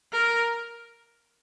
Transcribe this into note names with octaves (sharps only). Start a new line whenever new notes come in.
A#4